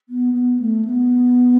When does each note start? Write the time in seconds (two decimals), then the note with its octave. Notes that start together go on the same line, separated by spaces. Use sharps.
0.09 B3
0.34 B3
0.60 A3
0.85 B3